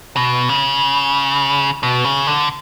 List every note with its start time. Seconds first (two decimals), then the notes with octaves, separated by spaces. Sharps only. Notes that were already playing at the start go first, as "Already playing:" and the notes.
0.16 B2
0.49 C#3
1.83 B2
2.05 C#3
2.27 D3